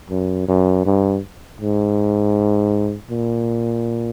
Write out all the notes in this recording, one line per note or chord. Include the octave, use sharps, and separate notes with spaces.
F#2
F#2
G2
G#2
A#2